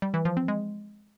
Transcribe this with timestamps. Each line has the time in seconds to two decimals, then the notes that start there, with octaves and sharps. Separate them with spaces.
0.02 G3
0.14 E3
0.25 F3
0.37 C4
0.48 G#3